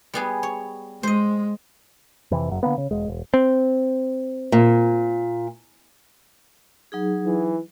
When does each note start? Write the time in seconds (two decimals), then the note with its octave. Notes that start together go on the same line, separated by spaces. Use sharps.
0.14 G3 B3 G#4
0.43 C#5
1.03 G#3 C5 D#5
2.31 F2 C3 E3
2.48 F#1 F#2
2.63 D3 F3 A#3 B3
2.78 C#3
2.91 E1 G#3
3.08 E1
3.34 C4
4.52 A#2
6.92 F#3 D#4 G#4
7.25 E3